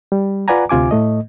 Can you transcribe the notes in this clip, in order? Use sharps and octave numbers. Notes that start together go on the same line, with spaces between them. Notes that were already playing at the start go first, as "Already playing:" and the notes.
G3
F4 B4 D5 F#5 G#5 A#5
D2 C3 F4 G#5 D6
A2 A3 D#5